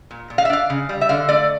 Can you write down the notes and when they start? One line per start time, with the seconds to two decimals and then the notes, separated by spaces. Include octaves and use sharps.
0.11 A#2
0.30 A#2
0.38 F5
0.45 E5
0.50 D4 F5
0.70 C#3
0.89 G3
1.01 E5
1.09 D3 F5
1.29 A3 D5